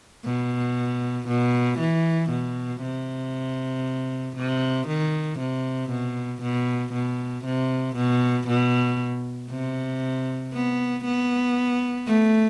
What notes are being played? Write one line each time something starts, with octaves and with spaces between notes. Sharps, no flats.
B2
B2
E3
B2
C3
C3
D#3
C3
B2
B2
B2
C3
B2
B2
C3
B3
B3
A3